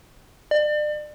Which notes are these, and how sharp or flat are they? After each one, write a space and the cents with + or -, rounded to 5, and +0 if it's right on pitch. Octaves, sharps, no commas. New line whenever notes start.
D5 +35